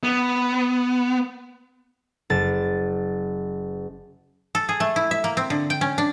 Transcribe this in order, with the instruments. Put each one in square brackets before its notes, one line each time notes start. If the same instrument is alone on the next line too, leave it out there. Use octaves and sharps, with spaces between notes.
[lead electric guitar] B3
[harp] F#1 A6
[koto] A4
G#4
A3
E4
E5
A#3
C4
D3
G5
C#4
D4